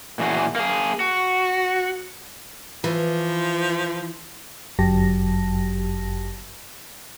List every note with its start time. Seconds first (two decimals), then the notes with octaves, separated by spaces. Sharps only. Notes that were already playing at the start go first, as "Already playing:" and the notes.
0.19 A#2 E3 F#4 G#4
0.56 A#3 G#4
1.00 F#4
2.84 E3 F3
4.79 G1 F#2 F#3 G4 A5 A#6